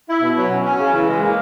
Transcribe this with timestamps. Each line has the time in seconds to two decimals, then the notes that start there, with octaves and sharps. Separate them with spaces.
0.08 E4
0.21 B2
0.36 F#3
0.51 C#4
0.65 C#4
0.78 C#3
0.93 E3
1.07 G#3
1.21 A#3